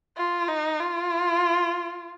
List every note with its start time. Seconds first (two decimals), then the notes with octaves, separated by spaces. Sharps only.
0.17 F4
0.48 D#4
0.80 F4